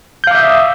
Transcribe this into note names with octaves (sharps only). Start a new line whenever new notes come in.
E5 F5 D6 D#6 G6